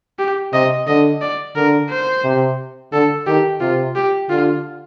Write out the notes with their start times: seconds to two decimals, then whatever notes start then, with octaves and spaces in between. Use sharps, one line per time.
0.19 G4
0.53 C3 D#5
0.87 D3 D#5
1.22 D5
1.55 D3 A#4
1.90 C5
2.24 C3
2.93 D3 A4
3.27 D#3 G4
3.61 C3 F4
3.96 G4
4.29 D3 F4